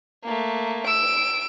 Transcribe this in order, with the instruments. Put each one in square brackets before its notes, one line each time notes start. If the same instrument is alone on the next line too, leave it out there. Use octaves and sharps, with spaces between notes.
[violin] A3 A#3
[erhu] E6 [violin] D7